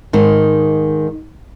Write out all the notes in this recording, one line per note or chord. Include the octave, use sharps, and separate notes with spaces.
G#2 D#3 D#4